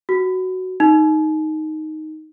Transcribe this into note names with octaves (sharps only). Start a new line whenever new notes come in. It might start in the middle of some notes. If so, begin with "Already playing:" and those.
F#4
D#4